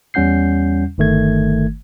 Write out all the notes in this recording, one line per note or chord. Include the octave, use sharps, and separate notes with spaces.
E2 G3 C#4 F#5 G6 C7
G1 D#3 A3 G#6